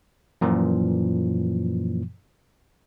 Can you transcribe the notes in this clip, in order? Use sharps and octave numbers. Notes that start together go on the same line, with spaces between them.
F#2 A#2 E3 F3